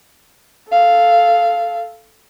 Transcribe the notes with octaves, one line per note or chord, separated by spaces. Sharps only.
A4 F5